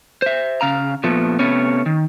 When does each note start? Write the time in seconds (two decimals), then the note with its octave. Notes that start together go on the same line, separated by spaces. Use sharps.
0.22 C5 E5
0.61 C#3 F5 A#5
1.04 A#2 F3 A3 B3
1.39 C3 A3 B3 C#4 C#5
1.86 D#3